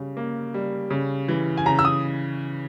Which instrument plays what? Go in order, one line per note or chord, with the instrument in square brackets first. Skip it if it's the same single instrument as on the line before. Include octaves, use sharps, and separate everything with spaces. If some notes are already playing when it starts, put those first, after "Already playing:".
Already playing: [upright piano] C#3 G3
A#3
G3
C#3
E3
[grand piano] G#5
[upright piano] C#3 [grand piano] A#5
[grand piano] E6
D#6